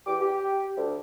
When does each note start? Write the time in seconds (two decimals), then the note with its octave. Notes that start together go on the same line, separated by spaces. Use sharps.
0.07 E2 G4 D6
0.21 G4
0.77 D2